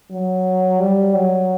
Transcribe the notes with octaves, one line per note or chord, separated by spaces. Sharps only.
F#3
G3
F#3